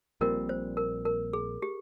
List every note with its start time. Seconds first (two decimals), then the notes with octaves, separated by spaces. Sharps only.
0.21 A#1 A#2 G3 C4 A#4
0.49 C5
0.77 A#4
1.05 A#4
1.33 G#4
1.62 G4